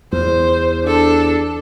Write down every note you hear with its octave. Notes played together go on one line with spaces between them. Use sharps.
E2 C5
D4 A4